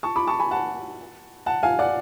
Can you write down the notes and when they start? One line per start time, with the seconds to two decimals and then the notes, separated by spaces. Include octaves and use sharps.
0.03 A5 C#6
0.16 B5 D6
0.27 A5 C#6
0.39 G#5 B5
0.51 F#5 A5
1.46 F#5 A5
1.63 F5 G#5
1.79 D5 F#5